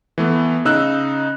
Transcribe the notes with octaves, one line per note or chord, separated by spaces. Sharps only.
E3 A3 B3
C#3 D#4 E6 F#6